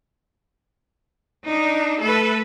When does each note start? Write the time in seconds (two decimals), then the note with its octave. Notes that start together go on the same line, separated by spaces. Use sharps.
1.45 D4 D#4
2.01 A3 A4 B4